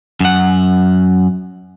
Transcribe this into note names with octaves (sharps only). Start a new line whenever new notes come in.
F#2 F#5